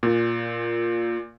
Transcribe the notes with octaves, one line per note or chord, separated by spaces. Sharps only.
A#2